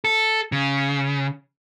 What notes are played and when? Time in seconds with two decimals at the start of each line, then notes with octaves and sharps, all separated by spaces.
0.04 A4
0.52 C#3